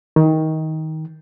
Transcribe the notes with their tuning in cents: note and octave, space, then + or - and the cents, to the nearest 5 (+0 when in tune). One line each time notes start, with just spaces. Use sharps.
D#3 +20